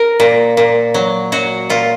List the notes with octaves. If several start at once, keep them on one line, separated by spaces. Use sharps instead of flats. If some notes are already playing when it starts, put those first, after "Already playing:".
Already playing: A#4
A#2
A#2
F#3
F#3 F#4
A#2 F4